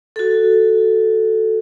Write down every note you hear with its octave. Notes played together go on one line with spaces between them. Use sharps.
F#4 A4